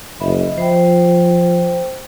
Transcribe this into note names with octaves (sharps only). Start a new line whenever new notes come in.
F#1 D#5 E5 B5
F3 C5 G5